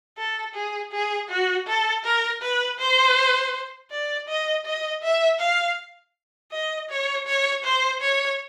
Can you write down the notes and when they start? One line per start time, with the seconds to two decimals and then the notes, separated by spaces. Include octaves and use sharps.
0.18 A4
0.55 G#4
0.92 G#4
1.29 F#4
1.67 A4
2.04 A#4
2.42 B4
2.79 C5
3.91 D5
4.28 D#5
4.65 D#5
5.03 E5
5.40 F5
6.52 D#5
6.90 C#5
7.27 C#5
7.64 C5
8.01 C#5